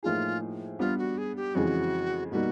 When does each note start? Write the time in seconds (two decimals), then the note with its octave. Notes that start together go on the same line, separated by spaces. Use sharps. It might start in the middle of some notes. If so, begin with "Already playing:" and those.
0.03 A2 F3 A#3 D#4 F4 G#4
0.79 G3 B3 D4 F4
0.98 F#4
1.18 G#4
1.36 G4
1.55 F2 C#3 E3 G#3 F#4
2.31 B2 G3 A#3 D#4 F#4